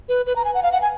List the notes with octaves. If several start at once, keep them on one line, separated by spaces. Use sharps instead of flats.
B4
B4
A#5
G#5
F#5
F5
F#5
G#5